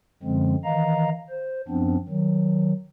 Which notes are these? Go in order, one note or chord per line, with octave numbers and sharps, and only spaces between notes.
F#2 D3 F3 G#3 C4
D#3 E3 D#5 F5 A#5
C5
F#2 F3 B3 C4 D4
D#3 F#3